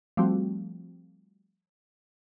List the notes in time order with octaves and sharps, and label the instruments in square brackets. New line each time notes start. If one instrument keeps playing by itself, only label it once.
[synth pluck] F3 G3 A3 C4 F#4